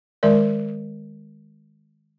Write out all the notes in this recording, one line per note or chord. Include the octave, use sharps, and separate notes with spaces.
D#3 G#3 A#4 D5